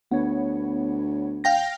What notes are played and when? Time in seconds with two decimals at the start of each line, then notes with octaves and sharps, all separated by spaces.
0.11 D2 B3 C#5
1.44 F5 G5 A#6